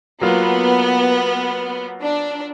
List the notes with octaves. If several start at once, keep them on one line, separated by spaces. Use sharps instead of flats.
F#3 A#3 B3 F4
D4